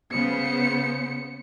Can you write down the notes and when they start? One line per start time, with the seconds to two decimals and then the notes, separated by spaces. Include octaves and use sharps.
0.12 C#3 B3 C5 C#7